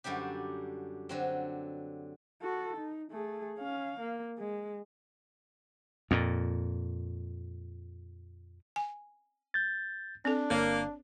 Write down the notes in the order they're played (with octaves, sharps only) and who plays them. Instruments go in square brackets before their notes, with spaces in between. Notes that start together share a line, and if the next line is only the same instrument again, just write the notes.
[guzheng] F#2 D3 G3 D4 G4
D3 F#3 C4
[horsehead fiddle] F#4 A4
D#4
A3 G#4
C#4 F5
A#3
G#3
[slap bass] F2 A#2
[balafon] G#5
[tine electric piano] G6 A6
[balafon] C4 A4 [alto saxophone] D4
[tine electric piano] G1 [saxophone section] A#3 [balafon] C#5